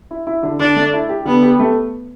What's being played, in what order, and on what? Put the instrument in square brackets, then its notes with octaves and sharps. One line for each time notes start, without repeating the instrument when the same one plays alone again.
[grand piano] E4
E4
D3
[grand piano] D3 [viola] D4
[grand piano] A3
E4
G4
[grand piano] D3 [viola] B3
[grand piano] G4
A3